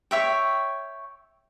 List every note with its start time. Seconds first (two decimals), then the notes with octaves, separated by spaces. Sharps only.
0.11 C#5 E5 G5